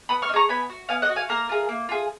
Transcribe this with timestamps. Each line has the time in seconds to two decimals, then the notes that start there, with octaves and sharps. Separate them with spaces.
0.09 B3 B5 D#6
0.22 C#6 F6
0.29 D#4
0.34 G#4 A#5 C#6
0.49 B3 G#5 B5
0.70 F#4
0.89 B3 F5 G#5
1.02 D#5 F#5
1.09 F#4
1.16 F5 G#5
1.29 A#3 A#4
1.49 F4 G#4
1.69 A#3
1.89 F4 G#4